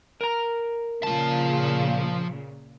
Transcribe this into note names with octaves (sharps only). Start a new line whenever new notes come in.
A#4 A#5
A#2 C#3 F3 A5